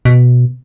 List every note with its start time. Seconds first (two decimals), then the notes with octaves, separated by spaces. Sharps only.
0.05 B2